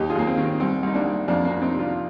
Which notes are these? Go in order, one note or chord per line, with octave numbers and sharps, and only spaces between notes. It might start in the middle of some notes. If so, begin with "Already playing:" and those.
Already playing: D#2 D#4 G4
F4 G#4
D#2 A#3
C4
D#3
C4
C2 C4
C2 D#4
A#3 D4
C2
F2 A#3 D4
A#3 D4
F2
D4
C4 D#4
C3
D4 F4